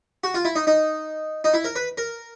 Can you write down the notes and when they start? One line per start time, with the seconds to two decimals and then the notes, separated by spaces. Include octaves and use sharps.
0.24 F#4
0.34 F4
0.45 E4
0.55 D#4
0.67 D#4
1.44 D#4
1.54 E4
1.64 A#4
1.76 B4
1.97 A#4